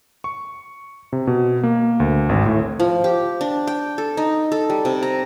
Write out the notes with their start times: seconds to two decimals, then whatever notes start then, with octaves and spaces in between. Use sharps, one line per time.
0.24 C#6
1.13 C3
1.27 B2
1.63 A#3
2.00 D2
2.29 G#1
2.46 A2
2.80 F3
3.04 G4
3.41 D4
3.67 G5
3.98 A4
4.17 D#4
4.52 A4
4.70 G3
4.85 C3
5.03 A#5